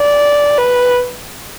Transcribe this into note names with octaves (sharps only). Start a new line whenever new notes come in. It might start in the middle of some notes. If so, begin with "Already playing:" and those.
Already playing: D5
B4